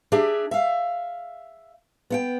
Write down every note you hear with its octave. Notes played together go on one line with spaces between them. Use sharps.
D4 G4 G#4 E5
E5 F5
B3 F#5 G5